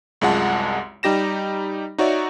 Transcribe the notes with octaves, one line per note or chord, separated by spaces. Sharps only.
C2 F#2 G#3 F4 F#5 A5
G3 D#4 G4 A#6 E7
D#4 F#4 C#5 D5 E5